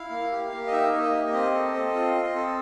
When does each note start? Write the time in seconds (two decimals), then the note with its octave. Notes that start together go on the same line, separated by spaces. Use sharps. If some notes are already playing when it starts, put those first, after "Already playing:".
Already playing: E4 F5
0.11 A#3
0.32 G4
0.51 A#3
0.67 D#5
0.72 D#4 E5
0.93 A#3
1.03 D#5
1.13 G4
1.33 C4 D#5
1.54 A4
1.74 C4
1.95 F4
2.15 C4
2.35 A4